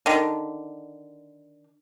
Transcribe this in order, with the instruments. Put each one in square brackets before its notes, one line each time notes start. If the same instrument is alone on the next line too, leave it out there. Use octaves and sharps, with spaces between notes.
[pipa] D3 D#3